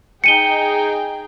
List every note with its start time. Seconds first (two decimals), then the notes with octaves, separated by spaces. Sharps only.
0.24 D#4 G#4 G5 C#7 D#7 G7